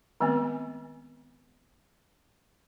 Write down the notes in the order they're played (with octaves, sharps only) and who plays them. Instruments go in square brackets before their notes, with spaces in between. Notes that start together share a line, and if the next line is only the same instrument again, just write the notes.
[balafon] D#3 G#3 A3 B3 C4